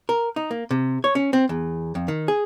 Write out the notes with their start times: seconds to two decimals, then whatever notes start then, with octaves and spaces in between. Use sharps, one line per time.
0.09 A#4
0.36 D#4
0.51 A#3
0.71 C3
1.04 C#5
1.15 C#4
1.33 C4
1.49 E2
1.95 F2
2.08 D#3
2.28 G#4